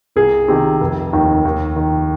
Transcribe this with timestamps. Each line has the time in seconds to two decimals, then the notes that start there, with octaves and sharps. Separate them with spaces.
0.16 C2 G#4
0.48 C3 D#3
0.80 F1
1.13 D#2 D#3
1.45 D#2
1.76 D#3